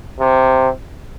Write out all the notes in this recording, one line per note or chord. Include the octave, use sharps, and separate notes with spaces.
C3